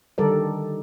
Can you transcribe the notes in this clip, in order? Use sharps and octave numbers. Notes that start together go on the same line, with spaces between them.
D3 D#3 G3 A4 A#4 D5